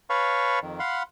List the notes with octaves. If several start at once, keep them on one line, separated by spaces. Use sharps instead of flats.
B4 C#5 F5 A5 B5 C#6
F2 D#3
F5 F#5 B5 C6